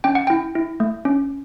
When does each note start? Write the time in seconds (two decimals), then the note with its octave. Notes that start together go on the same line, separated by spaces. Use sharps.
0.04 C#4 G5
0.15 F#5
0.27 E4 G5
0.55 E4
0.80 A3
1.05 C#4